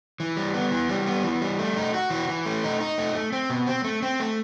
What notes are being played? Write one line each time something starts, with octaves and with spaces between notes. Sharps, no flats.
E3
G3
B3
E3
G3
B3
E3
G3
A3
D#4
F#4
E3
E3
A3
D#4
D#4
A3
A3
C4
B2
C4
A3
C4
A3